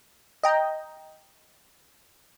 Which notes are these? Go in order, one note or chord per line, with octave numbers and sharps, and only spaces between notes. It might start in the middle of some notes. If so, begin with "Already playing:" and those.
D#5 G5 A#5